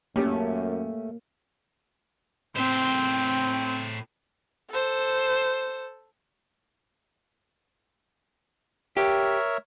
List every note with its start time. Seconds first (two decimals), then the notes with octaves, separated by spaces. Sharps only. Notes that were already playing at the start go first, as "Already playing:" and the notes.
0.16 F#2 A3 A#3 C#4 G4
2.56 A2 C4 C5
4.70 A4 C5
8.97 G4 A#4 C#5 E5